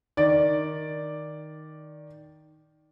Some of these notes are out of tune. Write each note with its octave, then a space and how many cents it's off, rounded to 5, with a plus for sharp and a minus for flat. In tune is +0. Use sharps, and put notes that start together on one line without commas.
D#3 +0 D5 +0